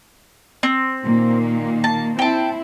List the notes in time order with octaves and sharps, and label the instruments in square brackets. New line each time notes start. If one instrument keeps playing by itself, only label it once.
[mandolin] C4
[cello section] A#2 D#3 A#3
[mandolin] A5
[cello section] C4 E4 [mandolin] G5 A5